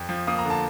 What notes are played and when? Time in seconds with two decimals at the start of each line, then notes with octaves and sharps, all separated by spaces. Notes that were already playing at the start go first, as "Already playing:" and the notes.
Already playing: F2
0.09 F3
0.27 A#3 D#6
0.38 A#5
0.45 D3
0.50 A5